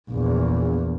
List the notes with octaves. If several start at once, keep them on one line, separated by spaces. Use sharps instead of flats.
A#1 E2